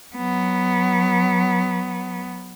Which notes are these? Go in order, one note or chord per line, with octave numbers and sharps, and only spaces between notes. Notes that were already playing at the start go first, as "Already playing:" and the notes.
F#3 B3